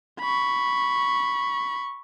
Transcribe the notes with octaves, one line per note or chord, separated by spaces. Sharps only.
B5 C#6